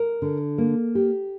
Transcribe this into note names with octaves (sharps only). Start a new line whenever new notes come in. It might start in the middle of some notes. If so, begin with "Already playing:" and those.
Already playing: A#4
D3
A#3
G4